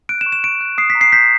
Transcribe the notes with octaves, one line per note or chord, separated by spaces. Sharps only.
F#6 D7
E7
C#6
E7
C#6 D7
F#6
D#6 C7
B6
A#5
C7
G6 B6